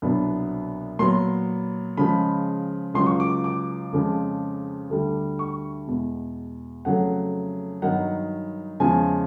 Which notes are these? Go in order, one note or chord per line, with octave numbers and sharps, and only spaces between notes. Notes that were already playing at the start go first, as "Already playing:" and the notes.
C2 B2 F#3 B3 D4
A#2 F#3 B3 C6
C#3 F3 G#3 B5
C#2 C#3 F#3 C6
C#6
D6
D6
F2 C#3 F3 G#3
D2 D3 G3
C#6
E2 B2 G#3
F2 C#3 F#3 A3 F#5
G2 D#3 F#3 B3 D#4 F#5
E2 C#3 F3 G#3 G#5